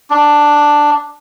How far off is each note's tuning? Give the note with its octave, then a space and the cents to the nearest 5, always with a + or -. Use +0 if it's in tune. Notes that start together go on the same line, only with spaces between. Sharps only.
D4 +5